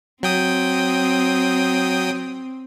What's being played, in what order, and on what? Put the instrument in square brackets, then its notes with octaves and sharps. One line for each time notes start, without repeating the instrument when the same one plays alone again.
[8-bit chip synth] F#3 G5 D#6 [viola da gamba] C4